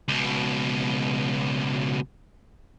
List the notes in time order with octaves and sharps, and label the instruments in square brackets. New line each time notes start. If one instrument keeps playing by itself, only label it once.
[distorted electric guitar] C#2 B2